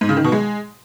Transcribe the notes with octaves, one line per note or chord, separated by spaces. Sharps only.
G#2
C#3
D#3
B2
G#3